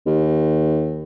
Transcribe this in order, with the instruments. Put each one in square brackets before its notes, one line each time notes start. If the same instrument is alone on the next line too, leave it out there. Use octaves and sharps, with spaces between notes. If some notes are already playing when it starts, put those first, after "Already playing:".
[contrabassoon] D#2